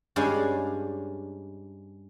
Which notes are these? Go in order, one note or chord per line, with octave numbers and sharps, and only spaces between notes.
G2 G#3 C#4 D4 F5 G#5